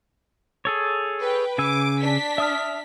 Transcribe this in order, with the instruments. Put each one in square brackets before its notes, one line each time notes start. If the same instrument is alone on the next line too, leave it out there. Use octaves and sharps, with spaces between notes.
[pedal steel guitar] G#4 A4 C#5
[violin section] B4 G5
[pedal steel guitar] C#3 G#5 E6 [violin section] D6
[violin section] D4 B6
[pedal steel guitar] E5 D#6 F6